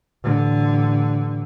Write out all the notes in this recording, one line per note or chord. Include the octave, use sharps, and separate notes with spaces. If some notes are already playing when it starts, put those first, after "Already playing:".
A1 D3